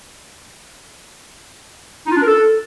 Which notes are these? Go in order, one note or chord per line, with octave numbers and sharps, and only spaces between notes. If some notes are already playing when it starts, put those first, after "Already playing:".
D#4
F4
D4
A#4
A4